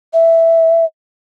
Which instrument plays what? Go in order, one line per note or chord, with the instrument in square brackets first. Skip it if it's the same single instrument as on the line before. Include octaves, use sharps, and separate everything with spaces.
[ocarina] E5